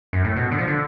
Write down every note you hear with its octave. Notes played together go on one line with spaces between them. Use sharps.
F#2
A2
B2
D3
F3
D3